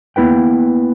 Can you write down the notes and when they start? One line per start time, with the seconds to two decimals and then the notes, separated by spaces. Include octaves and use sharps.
0.16 A#3 B3 E4 B4 G5